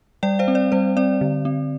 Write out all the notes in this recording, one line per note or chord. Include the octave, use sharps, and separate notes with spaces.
G3 D5 G5
C5 F5
C4
D5
G3 C5
C4 D5
D3
C4